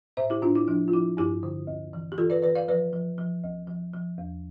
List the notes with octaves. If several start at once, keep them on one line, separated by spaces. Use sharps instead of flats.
A2 C5 E5
E4 G4
A2 D4 F4
E4
F3 D4
F4
F3 E4
G2 E4 G4
D3
D2
E3
G4
E3 F4 A4
B4 D5
E3 B4 D5
D5 F5
F3 B4 D5
F3
F3
D2
F3
F3
E2